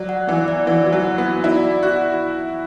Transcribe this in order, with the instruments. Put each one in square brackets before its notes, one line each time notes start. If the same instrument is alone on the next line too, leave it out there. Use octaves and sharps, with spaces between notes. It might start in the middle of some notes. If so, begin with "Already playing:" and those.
Already playing: [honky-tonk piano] F#3 [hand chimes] D5
[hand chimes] F#5
[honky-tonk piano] E3 [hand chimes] B3
[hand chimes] D5
[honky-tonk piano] E3 [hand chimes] B3
[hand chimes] F#4
[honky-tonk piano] F#3
[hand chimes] F#5
[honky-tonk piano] B3
[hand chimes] F#4
[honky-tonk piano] E4 [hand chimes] D5
[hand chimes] D5
[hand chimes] E4 [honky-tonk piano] F#4
[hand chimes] E4